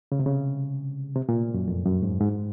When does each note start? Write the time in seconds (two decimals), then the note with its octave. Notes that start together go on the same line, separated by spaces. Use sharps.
0.12 C#3
0.19 C3
0.26 C#3
1.16 C3
1.29 A#2
1.54 F#2
1.68 F2
1.85 F#2
2.02 G#2
2.20 G#2